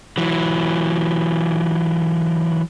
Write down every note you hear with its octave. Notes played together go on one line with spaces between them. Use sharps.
E3 F#3